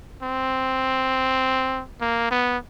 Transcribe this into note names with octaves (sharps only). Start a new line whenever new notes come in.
C4
A#3
B3